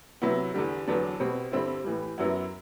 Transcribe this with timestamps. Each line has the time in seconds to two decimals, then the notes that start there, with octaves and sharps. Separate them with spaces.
0.22 C3 F#3 B3 E4
0.54 E2 D3 G3
0.88 E2 D3 F#3 B3 D4
1.20 B2 G3 C4
1.52 G2 D3 G3 C4 E4
1.84 A2 E3 G3
2.18 F#2 F#3 B3 E4